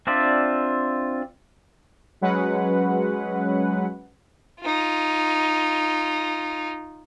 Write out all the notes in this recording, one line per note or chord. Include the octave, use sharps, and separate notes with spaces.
C4 D4 F4 D5 E5
F#3 G#3 C#4 B4 F#5
D#4 F4